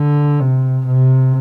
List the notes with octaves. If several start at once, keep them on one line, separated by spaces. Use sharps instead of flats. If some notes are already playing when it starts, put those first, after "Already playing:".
Already playing: D3
C3
C3